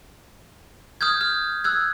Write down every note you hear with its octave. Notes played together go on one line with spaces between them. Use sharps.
D#6 F6 G6 G#6
F6
E6 F#6 G#6